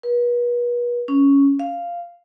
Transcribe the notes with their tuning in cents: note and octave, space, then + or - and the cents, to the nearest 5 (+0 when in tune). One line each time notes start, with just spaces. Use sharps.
B4 -40
C#4 +5
F5 -5